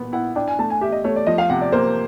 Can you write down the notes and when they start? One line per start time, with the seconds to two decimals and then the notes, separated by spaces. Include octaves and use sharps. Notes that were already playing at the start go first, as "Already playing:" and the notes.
Already playing: A#2 B3
0.13 E4 F#5
0.36 D4 G5
0.48 G#5
0.59 A3 A5
0.70 G#5
0.81 G4 E5
0.92 D#5
1.04 A3 C#5
1.16 D5
1.27 F3 D#5
1.38 F5
1.50 C3 F#5
1.61 D5
1.72 A#3 C5